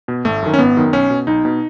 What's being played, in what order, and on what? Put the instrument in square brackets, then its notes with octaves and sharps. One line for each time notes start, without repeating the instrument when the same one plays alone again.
[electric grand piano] B2
G#1 A3
F#2 D#3
C#4
G#1 B3
F#2 D#3
B1 C#4
B2
B1 D#4
B2